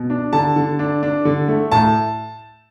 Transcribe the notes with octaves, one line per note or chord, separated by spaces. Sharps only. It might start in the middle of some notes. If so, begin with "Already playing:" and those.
Already playing: B2
D4
D3 A5
D3
D4
D4
D3
A3
A2 A5